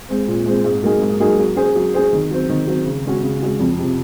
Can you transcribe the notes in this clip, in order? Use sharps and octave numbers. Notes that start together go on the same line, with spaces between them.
G#3 C4
A#2
G#3 C4
G#2
F#3 A#3 D#4 G#4
G#2
F#3 A#3 D#4 G#4
F#3
C#4 G#4 C5
F#3
C#4 G#4 C5
D#3
F#3 C4
D#3
F#3 C4
C#3
G#3 C#4 F#4
C#3
G#3 C#4 F#4
F2
C3 F3